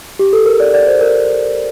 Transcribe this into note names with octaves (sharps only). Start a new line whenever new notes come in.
G4
A4
A#4
D5
D5
C5
A#4